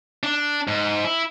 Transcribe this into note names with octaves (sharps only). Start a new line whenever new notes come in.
D4
G#2
E4